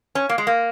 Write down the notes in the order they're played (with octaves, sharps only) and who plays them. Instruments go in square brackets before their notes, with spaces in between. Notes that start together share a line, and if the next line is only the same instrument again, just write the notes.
[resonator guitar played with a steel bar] C#4
A#3
G#3
A#3